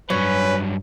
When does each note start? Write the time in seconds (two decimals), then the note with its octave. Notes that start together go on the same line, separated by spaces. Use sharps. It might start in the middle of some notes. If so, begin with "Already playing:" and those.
0.10 G2 F#3 C#4 B4